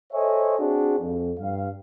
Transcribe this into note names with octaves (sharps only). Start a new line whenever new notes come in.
A4 C5 C#5 D#5 E5 G#5
C4 D4 F#4 G#4
F2
G2 F5